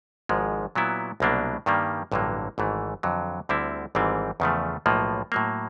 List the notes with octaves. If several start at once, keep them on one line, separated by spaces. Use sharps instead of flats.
G#1 G#2 F3 G#3
A#2 F#3 B3 E4
C2 B2 F#3 A#3 D4
G2 D#3 G3 A#3
A1 G2 D3 F#3 A#3
G#1 G#2 E3 A3
F2 D3 F#3
D2 D3 G3 C4 E4
G#1 G#2 E3 G3 C4
E2 C#3 F3 A3
B1 A2 F3 A#3
A2 F#3 A#3